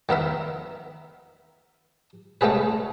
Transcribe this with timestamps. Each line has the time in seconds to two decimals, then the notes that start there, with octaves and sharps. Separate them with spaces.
0.09 D#3 B3 A#4 E5
2.41 G#3 A3 B3 C#4 G#4 B4